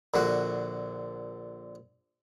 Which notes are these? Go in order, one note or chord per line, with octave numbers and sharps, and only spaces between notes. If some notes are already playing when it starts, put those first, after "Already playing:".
A#1 D3 F#4